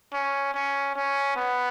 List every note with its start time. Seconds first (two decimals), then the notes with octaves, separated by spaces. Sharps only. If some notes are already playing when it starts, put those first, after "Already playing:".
0.13 C#4
0.54 C#4
0.95 C#4
1.36 B3